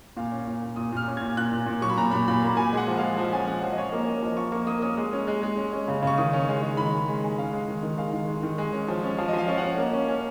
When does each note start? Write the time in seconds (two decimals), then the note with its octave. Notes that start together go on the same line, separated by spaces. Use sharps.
0.17 A#2 F5
0.32 C#4
0.47 A#2
0.62 A#2
0.76 A#2 D#6
0.92 A#2 F6
1.07 C#4
1.17 A#2 G#6
1.37 A#2 F#6
1.52 A#2
1.67 A#2
1.81 F#3 C#6
1.89 B5
1.98 A#2 A#5
2.11 A#2 B5
2.28 A#2 B5
2.43 A#3 B5
2.57 A#2 G#5
2.73 G#3 F#5
2.88 F3
2.98 G#3 F5
3.17 F3 F#5
3.32 C#4 G#5
3.47 C#4 F#5
3.63 F3
3.72 D#5
3.77 C#4 C#5
3.92 A#3
3.99 C#5
4.07 C#4 D#5
4.23 F3
4.37 F3 C#6
4.52 A#3 C#6
4.67 A#3 D#6
4.82 C#4 D#6
4.97 G#3
5.13 C#4
5.27 G#3
5.43 G#3
5.57 C#4
5.73 C#4
5.88 C#3
6.03 C#3 C#6
6.18 D#3 D#6
6.33 C#4
6.48 G#3
6.62 G#3
6.77 D#3 B5
6.93 G#3
7.08 G#3
7.23 G#3
7.38 C#4 F5
7.53 G#3
7.68 D#3
7.83 D#3
7.98 G#3 F5
8.13 D#3
8.28 G#3
8.43 D#3
8.58 G#3
8.73 C#4
8.88 F3
9.03 C#4
9.18 F3
9.29 F3 D#5
9.38 F5
9.48 C#4
9.58 F#5
9.63 C#4
9.78 A#3
9.93 C#4
10.08 C#4